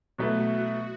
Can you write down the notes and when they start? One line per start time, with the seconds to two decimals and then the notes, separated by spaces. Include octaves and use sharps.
0.18 B2 F#3 A3 E4 F#4 B4